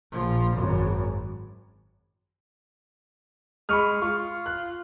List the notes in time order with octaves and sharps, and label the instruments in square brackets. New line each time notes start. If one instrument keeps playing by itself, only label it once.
[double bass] A#1 F3
G#1 F#2
[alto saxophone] G#3 [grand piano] B5 C#6 F6
[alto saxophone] F4 [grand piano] C#6
[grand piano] F#6